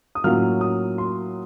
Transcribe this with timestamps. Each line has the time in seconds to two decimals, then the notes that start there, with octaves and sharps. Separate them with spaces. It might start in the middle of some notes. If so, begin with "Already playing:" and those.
0.15 D#6
0.24 A2 F#3 A#3 C#4 F4 F6
0.61 D#6
0.98 C6